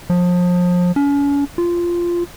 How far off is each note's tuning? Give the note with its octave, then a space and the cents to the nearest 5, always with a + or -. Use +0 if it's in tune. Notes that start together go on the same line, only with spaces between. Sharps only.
F3 +30
C#4 +40
F4 -10